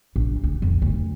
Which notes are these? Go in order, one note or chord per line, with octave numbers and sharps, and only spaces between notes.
A#1
D2
F2
D2